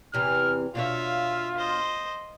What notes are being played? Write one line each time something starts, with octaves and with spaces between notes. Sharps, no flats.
E2 C3 E3 F6
B2 D4 F4 C#5 E5 F5
C5 D#5